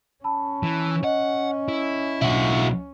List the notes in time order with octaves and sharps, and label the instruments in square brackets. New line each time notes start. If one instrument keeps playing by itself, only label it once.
[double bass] C#4 [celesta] A5 B5 E6
[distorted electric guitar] E3
[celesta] D#5 [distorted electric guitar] F#5
[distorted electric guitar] E4
[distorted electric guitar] B1 D4 [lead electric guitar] E4 F#4